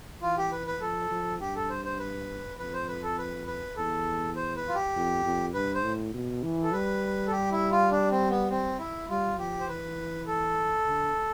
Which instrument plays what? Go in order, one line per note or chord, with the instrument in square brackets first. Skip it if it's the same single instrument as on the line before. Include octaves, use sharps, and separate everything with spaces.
[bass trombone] E3 [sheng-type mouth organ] F4
[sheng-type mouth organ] G4
B4
B4
[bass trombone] F3 [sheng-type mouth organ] A4
[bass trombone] F3
[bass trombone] G2 [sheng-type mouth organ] G4
[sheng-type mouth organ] A4
C5
C5
B4
[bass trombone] F2 [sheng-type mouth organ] B4
[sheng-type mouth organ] C5
B4
A4
B4
B4
[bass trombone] E2 [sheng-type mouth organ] A4
[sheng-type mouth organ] C5
B4
F4
G4
[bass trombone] F2
F2
[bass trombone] G2 [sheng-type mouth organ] B4
[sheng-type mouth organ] C5
[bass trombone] A2
B2
E3
[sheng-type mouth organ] A4
[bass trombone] G3 [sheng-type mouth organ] B4
[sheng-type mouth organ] A4
G4
E4
F4
D4
C4
B3
C4
E4
[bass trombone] G3 [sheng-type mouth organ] F4
[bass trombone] F3 [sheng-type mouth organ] G4
[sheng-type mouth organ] C5
[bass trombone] E3 [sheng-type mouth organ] B4
[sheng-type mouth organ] A4
[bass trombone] D3